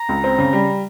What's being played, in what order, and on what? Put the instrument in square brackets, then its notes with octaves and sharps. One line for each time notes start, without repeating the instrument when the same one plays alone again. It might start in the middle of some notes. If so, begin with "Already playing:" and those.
Already playing: [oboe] A#5
[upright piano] C#2
C4
C#3
G3